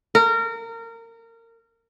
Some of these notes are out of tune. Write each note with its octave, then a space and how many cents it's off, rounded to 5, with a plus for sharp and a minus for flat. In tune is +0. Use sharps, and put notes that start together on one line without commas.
A#4 -25